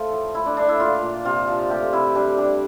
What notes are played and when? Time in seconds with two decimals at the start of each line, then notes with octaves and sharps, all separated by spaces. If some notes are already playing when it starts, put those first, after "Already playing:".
Already playing: F3 A3 F4 A4
0.12 A2
0.34 A3 E4
0.46 D4
0.57 A3 D4
0.69 E4
0.80 A#2 F4
1.02 A#2
1.25 C3 F4
1.48 F3
1.70 A3 G4
1.93 C3 E4
2.15 G3 D4
2.38 G3 D4